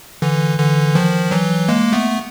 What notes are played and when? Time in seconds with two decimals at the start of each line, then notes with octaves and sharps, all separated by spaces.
0.22 D3 E3
0.58 D3 E3
0.95 D#3 F3
1.31 E3 F#3
1.68 G#3 A#3
1.93 A3 B3